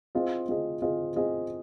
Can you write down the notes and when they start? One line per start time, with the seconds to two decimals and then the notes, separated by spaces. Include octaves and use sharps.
0.15 C4 F4 G#4 D#5
0.48 C4 F4 G#4 D#5
0.82 C4 F4 G#4 D#5
1.16 C4 F4 G#4 D#5